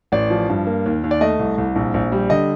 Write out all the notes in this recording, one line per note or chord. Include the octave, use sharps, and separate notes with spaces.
A1 D5
F3
G2
A#3
D#2
D#2
D5
A3 D#5
C2
C2
A#1
A#1
G3
D3 D#5